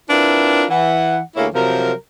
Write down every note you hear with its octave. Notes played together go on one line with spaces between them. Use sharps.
C4 D4 E4 F4 A#4 B4
E3 F#5
D2 A#3 E4 G#4 A4 C#5
C3 F3 F#3 A#4